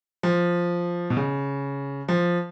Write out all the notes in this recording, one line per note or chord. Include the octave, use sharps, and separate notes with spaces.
F3
B2
C#3
F3